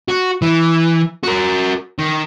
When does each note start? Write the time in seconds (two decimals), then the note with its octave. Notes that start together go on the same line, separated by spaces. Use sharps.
0.09 F#4
0.42 E3
1.24 F#4 A#4
1.99 D#3